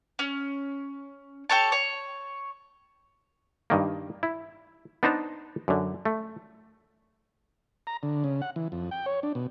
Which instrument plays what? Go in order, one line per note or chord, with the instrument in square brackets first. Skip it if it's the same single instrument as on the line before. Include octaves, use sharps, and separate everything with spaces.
[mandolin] C#4
G4 A4 C#5 A5
C#5
[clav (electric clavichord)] G2 D#3 A#3
E4
B3 D4 D#4 C5 A5 A#5
F#2 D3
A3
[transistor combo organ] A#5
D3
C#3
F#5
E3
F2
G5
C#5
D4
B2